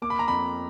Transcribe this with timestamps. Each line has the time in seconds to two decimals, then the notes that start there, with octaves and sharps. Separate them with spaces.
0.02 A#3 D6
0.10 B5
0.19 A#5
0.28 F2 B5